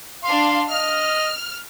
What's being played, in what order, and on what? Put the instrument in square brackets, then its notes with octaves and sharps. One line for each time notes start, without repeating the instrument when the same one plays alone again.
[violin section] D4 F5 [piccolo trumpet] C6
[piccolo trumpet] D#5 [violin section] F6